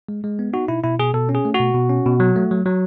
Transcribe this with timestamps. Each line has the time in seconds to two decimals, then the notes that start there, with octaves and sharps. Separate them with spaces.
0.09 G#3
0.24 G#3
0.39 B3
0.53 D#4 F#4
0.68 B2 E4
0.84 B2 E4
0.99 B2 G#4
1.14 B2 A4
1.29 C#4
1.35 G#4
1.45 A3
1.54 F#4
1.60 B2
1.74 B2
1.89 C#4
2.06 B2
2.20 F#3
2.36 A3
2.51 F#3
2.66 F#3